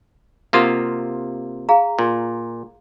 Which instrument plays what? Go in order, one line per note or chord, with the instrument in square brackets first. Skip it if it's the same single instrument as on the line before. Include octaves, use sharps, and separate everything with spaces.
[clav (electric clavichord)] C3 A#3 F4 [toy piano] F#5 C6 D#6
[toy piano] G#4 F5 A#5
[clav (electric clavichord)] A#2